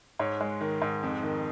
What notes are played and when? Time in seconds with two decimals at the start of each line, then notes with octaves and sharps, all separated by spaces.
0.20 G#2 C#5
0.41 G#3
0.61 D#3
0.82 G#2
1.03 F2
1.23 D#3